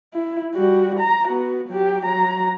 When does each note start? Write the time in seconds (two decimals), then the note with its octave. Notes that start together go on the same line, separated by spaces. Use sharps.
0.14 E4
0.54 G3 F#4
0.99 A#5
1.28 B3 F#4
1.69 F#3 G4
2.05 F#3 A#5